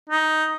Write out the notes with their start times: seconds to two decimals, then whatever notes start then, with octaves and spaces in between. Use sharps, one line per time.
0.10 D#4